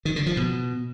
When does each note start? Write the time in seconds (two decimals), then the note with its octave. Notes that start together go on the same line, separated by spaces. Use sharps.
0.05 D#3
0.16 D3
0.26 F3
0.37 B2